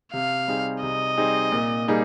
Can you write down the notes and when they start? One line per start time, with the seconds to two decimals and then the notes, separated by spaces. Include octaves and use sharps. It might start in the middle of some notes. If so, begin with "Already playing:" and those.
0.13 C3 F5
0.48 G3 C4 D#4 G#4
0.83 C3 D#5
1.17 G3 C4 D#4 G#4
1.52 A#2
1.88 G3 A#3 D#4 G#4